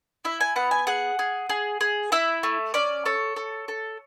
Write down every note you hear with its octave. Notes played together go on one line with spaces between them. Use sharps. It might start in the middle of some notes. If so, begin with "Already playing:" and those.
E4 E5
G#5
B3 F#5
G#5
G#4 F#5
G#4
G#4
G#4
E4 E5
A3
C#4 D5
A4 C#5
A4
A4